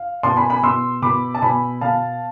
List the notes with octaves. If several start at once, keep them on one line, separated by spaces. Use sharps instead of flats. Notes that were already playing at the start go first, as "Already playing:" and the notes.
Already playing: F5
B2 A5 C6
G#5 B5
G#5 B5
B2 C6 E6
B2 B5 D6
A5
B2 G#5 B5
B2 F5 A5